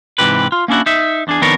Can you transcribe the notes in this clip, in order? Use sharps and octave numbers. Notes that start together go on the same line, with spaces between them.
G#2 C3 E3 G4 B4
F4
A#3 C#4 D4 E4 F#4
D#4 E5
E2 D4 G#4
F2 D#3 B3 D4 A#4 C#5